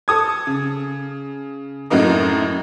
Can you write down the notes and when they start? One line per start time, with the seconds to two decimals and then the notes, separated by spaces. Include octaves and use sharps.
0.08 A4 D#6 G#6
0.47 C#3
1.90 F#2 A2 F#3 A#3 D#4